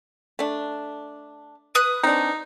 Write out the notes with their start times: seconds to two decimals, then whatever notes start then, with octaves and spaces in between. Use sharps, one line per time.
0.39 A3 D4
1.75 B4 D#6 F#6
2.04 C4 D4 D#4